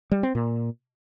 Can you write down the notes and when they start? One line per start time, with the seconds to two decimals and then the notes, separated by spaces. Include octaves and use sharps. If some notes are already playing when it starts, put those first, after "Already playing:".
0.12 G3
0.23 C4
0.35 A#2